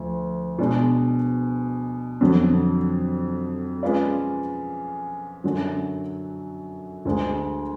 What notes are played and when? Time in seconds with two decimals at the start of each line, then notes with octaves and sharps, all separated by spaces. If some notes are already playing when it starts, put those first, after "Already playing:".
Already playing: D2 F3 A3
0.58 B2 G#3 D4
2.21 F2 D3 F#3
3.83 G#3 C#4 F4 B4 D5
5.44 F#2 D3 F#3
7.05 D2 D3 G#3